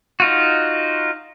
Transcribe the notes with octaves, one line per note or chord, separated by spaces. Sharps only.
D#4 F4 F#4